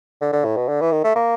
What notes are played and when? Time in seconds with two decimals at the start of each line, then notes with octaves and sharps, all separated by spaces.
0.21 D3
0.33 D3
0.45 A2
0.57 B2
0.68 D3
0.81 E3
0.92 D#3
1.04 A3
1.16 A#3